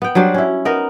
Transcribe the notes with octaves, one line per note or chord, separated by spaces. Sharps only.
B3 G5
F#3 G3 D4 C5
C#4 E4
B3 D#4 A#4 D#5